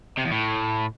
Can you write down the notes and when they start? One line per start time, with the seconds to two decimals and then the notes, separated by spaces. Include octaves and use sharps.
0.17 C3
0.24 E2
0.31 A2